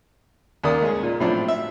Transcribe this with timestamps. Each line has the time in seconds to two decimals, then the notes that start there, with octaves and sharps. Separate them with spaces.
0.64 D#2 D#3 A#3 D5 D#6
0.82 G#3 C#4 G#4
1.03 A#2
1.20 A2 F3 F#3 C4 D4
1.48 E5